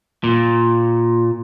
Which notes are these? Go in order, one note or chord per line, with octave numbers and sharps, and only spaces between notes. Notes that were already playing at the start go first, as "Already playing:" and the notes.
A#2